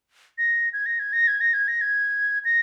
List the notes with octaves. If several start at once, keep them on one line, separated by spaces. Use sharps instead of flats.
A#6
G#6
A#6
G#6
A#6
G#6
A#6
G#6
A#6
G#6
A#6